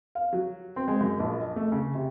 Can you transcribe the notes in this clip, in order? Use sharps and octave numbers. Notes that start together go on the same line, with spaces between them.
F5
F#3
C4
G#3
F#2
A#1
D#5
A3
C#3
C3